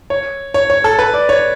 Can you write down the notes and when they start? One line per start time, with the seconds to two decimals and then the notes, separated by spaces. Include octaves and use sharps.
0.10 C#5
0.54 C#5
0.70 C#5
0.84 A4
0.99 B4
1.14 D5
1.29 C#5